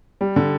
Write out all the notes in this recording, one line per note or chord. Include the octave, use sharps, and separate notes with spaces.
G3
D3